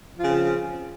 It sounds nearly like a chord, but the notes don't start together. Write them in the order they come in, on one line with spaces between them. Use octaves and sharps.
F3 F4 C#3 C4